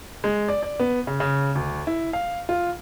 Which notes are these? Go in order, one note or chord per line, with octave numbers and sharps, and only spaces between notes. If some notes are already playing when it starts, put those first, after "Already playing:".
G#3
D5
D5
B3
C#3
C#3
D2
E4
F5
F4